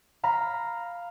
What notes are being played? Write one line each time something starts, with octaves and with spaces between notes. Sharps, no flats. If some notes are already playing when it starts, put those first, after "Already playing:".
F5 A#5 B5